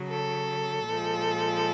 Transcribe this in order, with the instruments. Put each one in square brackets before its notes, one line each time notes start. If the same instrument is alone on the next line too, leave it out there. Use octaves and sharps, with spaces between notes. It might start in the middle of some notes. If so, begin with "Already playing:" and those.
Already playing: [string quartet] C#3 F#3
A4
A#2 F3 G#3